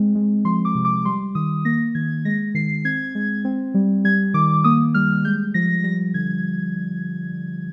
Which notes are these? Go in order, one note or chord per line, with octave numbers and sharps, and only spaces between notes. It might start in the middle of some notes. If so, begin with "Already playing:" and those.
Already playing: G#3 C4
G#3
F3 C6
D6
C3
D6
G3 C6
D#3 D#6
A#3 A#6
D#3 G#6
G#3 A#6
D#3 C7
C4 G#6
G#3
C4
G3
G3 G#6
D#3 D6
A#3 D#6
G3 F6
G#3 G6
F3 A#6
G3 A#6
D3 G#6